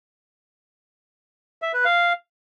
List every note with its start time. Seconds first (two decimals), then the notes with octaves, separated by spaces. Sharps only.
1.62 E5
1.73 B4
1.85 F5